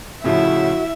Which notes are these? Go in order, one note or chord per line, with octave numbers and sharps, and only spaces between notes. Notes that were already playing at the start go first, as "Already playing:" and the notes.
A2 C#3 F3 E4 F#4 E5